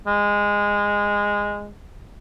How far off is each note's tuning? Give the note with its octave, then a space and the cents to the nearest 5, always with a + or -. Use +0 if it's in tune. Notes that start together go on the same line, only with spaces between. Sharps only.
G#3 -15